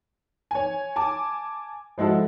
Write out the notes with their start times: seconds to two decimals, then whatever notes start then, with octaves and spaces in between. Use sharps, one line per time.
0.51 C#5 G#5
0.96 G#5 A5 D6
1.98 F3 G#3 E4 F#4 A4